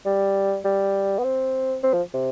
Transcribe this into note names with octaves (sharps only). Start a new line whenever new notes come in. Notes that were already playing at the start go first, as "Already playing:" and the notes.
G3
G3
B3
C4
C4
F3
C3